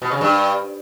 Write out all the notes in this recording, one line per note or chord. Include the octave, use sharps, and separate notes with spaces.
B2
C#3
G2